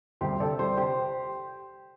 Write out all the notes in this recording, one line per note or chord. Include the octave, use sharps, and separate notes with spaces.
D2 C3 G3 G4 C5
A4 D5
D2 C3 G3 G4 C5
G4 C5